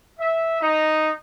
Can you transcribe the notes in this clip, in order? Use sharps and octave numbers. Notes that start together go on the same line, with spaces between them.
E5
D#4